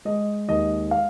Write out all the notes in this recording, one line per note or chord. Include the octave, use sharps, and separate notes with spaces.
G#3 D#5
D#2 D#5
F5